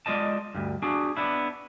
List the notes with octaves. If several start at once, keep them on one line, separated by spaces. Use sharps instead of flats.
G#3 F4 D5 D#5 A5
D2 G2
D4 F#4 G#4
B3 D4 E4